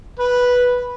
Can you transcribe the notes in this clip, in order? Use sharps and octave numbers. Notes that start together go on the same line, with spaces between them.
B4